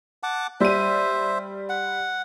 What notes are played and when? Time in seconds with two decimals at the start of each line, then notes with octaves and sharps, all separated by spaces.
0.23 F#5 A5 D6
0.60 G3 C5 E5 D#7
1.69 F#5